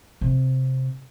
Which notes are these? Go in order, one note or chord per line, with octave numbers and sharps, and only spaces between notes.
C3